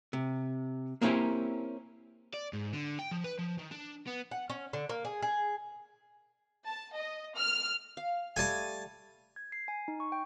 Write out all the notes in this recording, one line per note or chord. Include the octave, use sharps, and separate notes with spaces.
C3
A#3 C4 C#4 E4 G4 A#4
D5
G#2
D3
G5
F3
B4
F3
D#3
D4
B3
F#5
C#4
D3
A#3
G#4
G#4
A5
D#5
F6
F5
G3 A3 G#5 A5
G#6
C7
G#5
D#4
C#6
G5